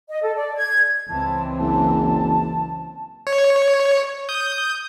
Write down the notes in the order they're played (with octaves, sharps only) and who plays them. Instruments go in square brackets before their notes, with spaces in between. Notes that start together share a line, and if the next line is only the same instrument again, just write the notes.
[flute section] D#5
A4
D5
G#6
[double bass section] C#2 E3 C4 [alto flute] A5
[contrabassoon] F#1 [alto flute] A5
[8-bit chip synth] C#5
D#6 G6